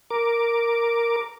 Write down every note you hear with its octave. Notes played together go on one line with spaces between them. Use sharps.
A#4 D6